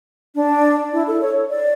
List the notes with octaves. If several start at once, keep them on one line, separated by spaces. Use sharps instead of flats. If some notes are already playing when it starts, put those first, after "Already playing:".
D4
E4
A4
C#5
D5